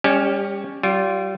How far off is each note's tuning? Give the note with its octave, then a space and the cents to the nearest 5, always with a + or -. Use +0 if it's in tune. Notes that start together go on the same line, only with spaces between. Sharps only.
G3 +35 C#4 +0 G4 +0
G3 -30 F4 +0